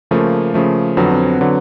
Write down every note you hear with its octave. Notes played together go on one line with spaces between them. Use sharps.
C#3 F3 A3 A#3
C#3 F3 A3
F2 D3 F#3 B3
C4
B3
D3 F#3 B3